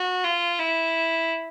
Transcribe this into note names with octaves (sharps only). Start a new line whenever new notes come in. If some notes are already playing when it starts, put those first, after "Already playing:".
Already playing: F#4
F4
E4